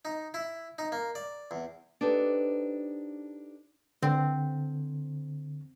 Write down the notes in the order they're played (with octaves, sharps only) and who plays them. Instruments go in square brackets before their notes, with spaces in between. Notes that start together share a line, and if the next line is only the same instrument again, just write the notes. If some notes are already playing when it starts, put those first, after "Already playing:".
[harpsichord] D#4
E4
D#4
A#3
D5
E2
[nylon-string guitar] D4 D#4 G4 A4 B4 C5
[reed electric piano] D3 [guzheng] C4